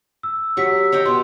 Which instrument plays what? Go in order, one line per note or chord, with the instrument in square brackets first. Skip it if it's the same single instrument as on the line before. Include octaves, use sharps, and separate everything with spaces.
[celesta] E6
[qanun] F#3 C#6 [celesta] G4 E6 B6
[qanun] C#5 D#5 G5
[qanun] B2 [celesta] C6